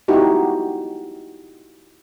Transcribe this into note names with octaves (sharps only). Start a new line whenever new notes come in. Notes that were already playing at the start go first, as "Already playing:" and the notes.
D#4 E4 F#4 G4